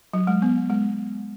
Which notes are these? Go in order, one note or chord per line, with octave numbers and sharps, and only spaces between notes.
F#3
G#3
B3
G#3